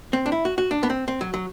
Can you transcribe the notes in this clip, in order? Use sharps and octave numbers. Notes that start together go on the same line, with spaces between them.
C4
D4
E4
F#4
F#4
D4
B3
C4
C4
F#3
F#3